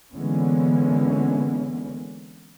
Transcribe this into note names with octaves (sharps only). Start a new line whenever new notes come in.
D3 E3 G#3 A#3 B3 C#4